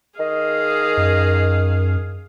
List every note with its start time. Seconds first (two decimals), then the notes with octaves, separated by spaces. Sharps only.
0.19 D#3 G#4 D#5 F5
0.97 F#2